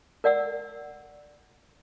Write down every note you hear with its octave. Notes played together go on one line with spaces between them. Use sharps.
A#4 D5 F#5 E6